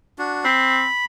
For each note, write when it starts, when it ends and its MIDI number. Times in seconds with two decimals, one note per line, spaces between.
0.19 0.45 62
0.19 0.45 66
0.45 0.85 60
0.45 1.05 83